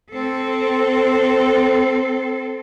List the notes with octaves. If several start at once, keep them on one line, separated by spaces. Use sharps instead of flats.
C4 A4